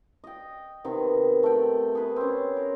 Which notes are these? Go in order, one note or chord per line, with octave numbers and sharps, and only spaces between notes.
D#5 G5
C3 D#3 B3
A3 G5
G#4 B4
C4 C#4
A#4